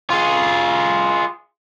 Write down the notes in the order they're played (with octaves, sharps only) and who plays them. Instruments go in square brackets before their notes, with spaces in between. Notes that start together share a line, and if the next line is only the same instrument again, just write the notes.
[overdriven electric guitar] F4 G#4